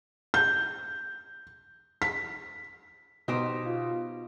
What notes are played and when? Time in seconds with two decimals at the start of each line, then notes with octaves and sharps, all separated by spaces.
0.34 G6
2.02 B6
3.28 B2 D#4 G4 C5
3.67 F4